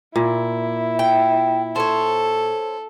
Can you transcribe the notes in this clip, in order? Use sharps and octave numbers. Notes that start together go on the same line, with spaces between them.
A#2 E4
G5
A4 C5 C#5